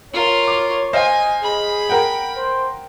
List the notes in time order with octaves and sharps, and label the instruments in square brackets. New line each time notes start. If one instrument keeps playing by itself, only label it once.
[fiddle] F4 A#4 [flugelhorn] C#5
[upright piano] D6
[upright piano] C5 D#5 F5 [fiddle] G#5
[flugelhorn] G#4 [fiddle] B5
[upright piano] A#4 F#5 G5
[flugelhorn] C5